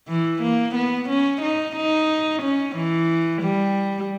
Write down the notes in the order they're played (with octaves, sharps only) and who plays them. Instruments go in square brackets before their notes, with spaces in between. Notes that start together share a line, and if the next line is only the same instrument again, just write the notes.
[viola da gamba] E3
A#3
B3
C#4
D#4
D#4
C#4
E3
G3